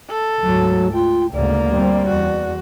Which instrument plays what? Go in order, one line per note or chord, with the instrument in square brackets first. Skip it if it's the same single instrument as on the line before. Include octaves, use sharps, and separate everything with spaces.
[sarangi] A4
[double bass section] D2 G#2 [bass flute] F#3
[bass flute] F4 [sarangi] G5
[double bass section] D2 G#2 C#3 [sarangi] A#3 [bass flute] D5
[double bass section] G3 C4
[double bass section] E2 [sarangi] F#4